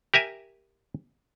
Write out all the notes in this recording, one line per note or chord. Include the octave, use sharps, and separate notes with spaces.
G4 A#4 E5 G#5